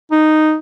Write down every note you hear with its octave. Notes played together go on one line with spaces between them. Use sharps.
D#4